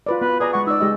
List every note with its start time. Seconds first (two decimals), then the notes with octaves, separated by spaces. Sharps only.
0.07 F4 B4 D5
0.21 B3 B4
0.40 G#4 B4 D5 A#5
0.53 G#3 F#5 C#6
0.67 D#4 D5 E6
0.81 G#3 G4 D#5